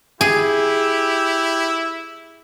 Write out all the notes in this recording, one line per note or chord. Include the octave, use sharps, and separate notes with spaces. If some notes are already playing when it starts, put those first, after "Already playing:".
E4 G4 G#4